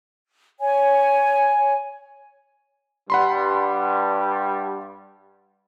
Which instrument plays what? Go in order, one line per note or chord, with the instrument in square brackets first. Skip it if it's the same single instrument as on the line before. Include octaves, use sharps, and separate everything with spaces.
[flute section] C#5 G#5
[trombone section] G2 G3 [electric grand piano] F#5 B5 C6